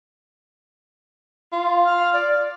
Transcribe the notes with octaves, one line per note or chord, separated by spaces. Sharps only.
F4
F6
D5